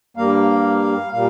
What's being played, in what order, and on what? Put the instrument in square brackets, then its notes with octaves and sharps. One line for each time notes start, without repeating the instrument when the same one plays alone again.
[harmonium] G2 G3 A#3 F5
A#2 G3 F5